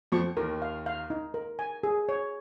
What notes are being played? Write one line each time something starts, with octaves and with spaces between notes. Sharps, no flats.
F2 F3 C#6
D#2 D#3 A#4
F5
F5
D#4
A#4
G#5
G#4
C#5